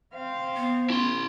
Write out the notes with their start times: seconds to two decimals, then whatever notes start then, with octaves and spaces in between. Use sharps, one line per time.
0.14 C4 F5
0.57 B3
0.90 E4 C6